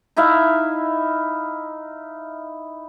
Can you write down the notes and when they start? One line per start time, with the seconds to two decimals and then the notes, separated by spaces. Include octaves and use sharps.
0.16 D#4 E4 E5 F5